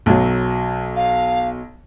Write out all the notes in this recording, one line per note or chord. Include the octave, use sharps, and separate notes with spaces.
B1 F#3
F5